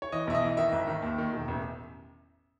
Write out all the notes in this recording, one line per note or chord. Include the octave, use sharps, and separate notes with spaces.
C#5
E3 D#5
B1 E5
D#5
E3
D#3 E5
G#1
D#3
D#2
D#3
E1
A1